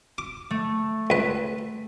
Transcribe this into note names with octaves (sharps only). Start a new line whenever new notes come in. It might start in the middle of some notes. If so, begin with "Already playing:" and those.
D6
A3
C#2 B4